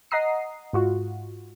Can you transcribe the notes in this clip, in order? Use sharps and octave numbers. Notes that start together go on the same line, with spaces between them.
D#5 F#5 A#5 D#6 C7
G#2 F4 F#4